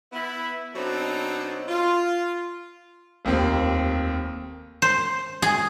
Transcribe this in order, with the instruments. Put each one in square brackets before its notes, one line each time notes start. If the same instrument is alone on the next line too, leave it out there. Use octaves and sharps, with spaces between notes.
[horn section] B3 E4
B2 F#3 C4 D4 D#4 A4
F4
[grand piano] F1 D#2 A#3 C4
[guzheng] C5
G#4